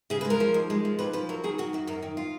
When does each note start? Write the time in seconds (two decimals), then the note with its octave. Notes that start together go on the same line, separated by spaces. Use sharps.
0.10 C#3 G#4
0.21 B4
0.25 G#3
0.30 A#4
0.40 F3
0.54 D#2
0.70 G#3
0.85 F3
0.99 D#2 B4
1.13 F3 B4
1.29 F#3 A#4
1.44 D#3 G#4
1.58 D#3 F#4
1.73 F#2 F#4
1.87 F#2 A#4
2.02 D#3
2.17 F4